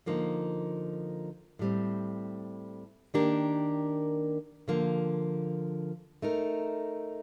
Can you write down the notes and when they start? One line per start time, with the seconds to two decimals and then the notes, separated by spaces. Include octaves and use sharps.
0.06 D3 F3 A#3 D#4
1.59 A2 G3 C4
3.14 D#3 A#3 D4 G4 A#4
4.68 D3 F3 A#3
6.22 A3 D#4 A#4